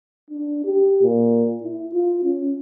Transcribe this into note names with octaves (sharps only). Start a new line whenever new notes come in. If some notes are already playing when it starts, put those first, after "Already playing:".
D4
G4
A#2
E4
F4
C#4